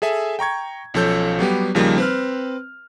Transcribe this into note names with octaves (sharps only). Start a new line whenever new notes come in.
G#4 A4 E5 G#5
G5 A#5 C#6 G#6
B1 F3 C#4 A4 C#5 G6
F#3 G3 B3 G4
D#2 C#3 F3 G3 A#3 D#4
C4 B4 F6